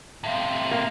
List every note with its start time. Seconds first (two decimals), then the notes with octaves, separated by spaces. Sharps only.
0.24 A2 C3 E5 F5 C6
0.71 A#3